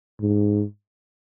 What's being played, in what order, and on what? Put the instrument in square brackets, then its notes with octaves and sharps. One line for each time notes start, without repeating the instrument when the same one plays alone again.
[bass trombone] G#2